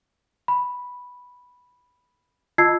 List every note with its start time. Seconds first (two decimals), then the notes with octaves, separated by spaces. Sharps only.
0.48 B5
2.58 F4 D#5 A5 E6 G#6 C7